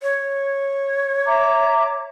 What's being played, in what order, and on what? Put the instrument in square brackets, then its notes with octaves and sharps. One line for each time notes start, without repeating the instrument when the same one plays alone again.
[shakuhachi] C#5
[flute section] E5 A#5 D6